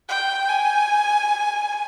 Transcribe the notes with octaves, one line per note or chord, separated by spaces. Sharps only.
G5
G#5